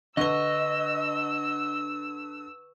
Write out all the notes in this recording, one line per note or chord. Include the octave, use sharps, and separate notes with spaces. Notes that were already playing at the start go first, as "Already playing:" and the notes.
D3 B4 D#5 C#6 E6 G7